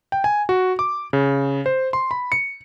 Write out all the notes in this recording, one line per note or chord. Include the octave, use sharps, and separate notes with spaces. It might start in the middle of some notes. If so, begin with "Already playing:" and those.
G5
G#5
F#4
D6
C#3
C5
C6
B5
C#7